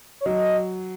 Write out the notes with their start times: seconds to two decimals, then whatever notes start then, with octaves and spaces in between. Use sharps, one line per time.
0.21 C#5
0.26 F#3 D#5